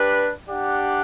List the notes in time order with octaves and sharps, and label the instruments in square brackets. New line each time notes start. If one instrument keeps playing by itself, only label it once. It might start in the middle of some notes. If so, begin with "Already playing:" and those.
Already playing: [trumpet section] D4 G4 B4
D4 G4 D5 F#5